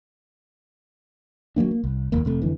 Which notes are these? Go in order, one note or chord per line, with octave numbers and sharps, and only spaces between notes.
F#3 G3 A#3 D4
A#3
C2
F1 D#2 A#3
F1 C3 A3
F2 D3 E3